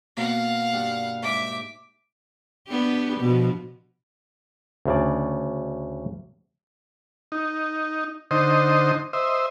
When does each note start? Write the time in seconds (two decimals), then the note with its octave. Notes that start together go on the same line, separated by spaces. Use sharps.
0.17 B2 A#3 F5 F#5
0.73 G2 D4
1.23 G#2 E5 D6
2.68 B3 D4 G4
3.21 B2 F3
4.85 D2 C#3 D5
7.32 D#4
8.31 D3 D#4 C5 D#5
9.13 C5 D#5 E5